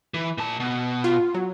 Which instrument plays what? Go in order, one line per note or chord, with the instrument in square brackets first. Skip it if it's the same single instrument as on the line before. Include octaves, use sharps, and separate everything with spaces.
[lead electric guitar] E3
A#2 A5
B2
[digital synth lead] F4
F#3